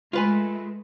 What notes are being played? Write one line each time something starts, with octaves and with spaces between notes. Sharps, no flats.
G#3 A3 F4 B4 G#5